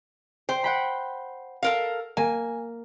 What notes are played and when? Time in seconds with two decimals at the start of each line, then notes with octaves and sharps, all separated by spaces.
0.49 C5 G5
0.64 F#5 G5 B5
1.63 A4 A#4 F5
2.17 A#3 G#5